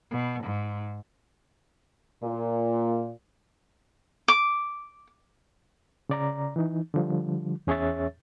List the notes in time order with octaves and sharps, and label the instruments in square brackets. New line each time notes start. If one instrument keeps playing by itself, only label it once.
[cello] B2
G#2
[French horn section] A#2
[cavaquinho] D6
[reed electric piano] C#3 D5 A#5
E3 D#4
D3 F3 G3
E2 C#4 G#4 C#5 E5 A6